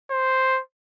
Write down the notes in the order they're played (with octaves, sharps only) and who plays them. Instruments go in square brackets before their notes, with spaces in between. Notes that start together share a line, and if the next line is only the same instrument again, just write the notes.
[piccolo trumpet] C5